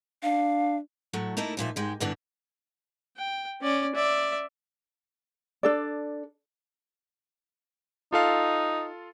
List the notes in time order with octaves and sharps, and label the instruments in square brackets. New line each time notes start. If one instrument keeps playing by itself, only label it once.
[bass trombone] D4 [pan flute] F5
[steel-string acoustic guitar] A2 F#3 A3
A3 A#3 D#4 E4 A4
D#2 A#2 F3 E5
G#2 G#3 G4
E2 G2 D3 E3 D4
[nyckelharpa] G5
C#4 D5
D5 E5
[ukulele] D4 A4 D5
[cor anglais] D#4 [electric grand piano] F4 A4 F5